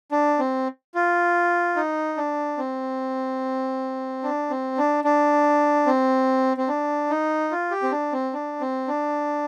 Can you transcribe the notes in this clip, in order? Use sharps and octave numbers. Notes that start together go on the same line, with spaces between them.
D4
C4
F4
D#4
D4
C4
D4
C4
D4
D4
C4
C4
D4
D#4
F4
G4
C4
D4
C4
D4
C4
D4